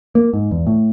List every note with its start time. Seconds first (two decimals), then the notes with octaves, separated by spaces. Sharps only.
0.15 A#3
0.34 G#2
0.51 E2
0.67 A2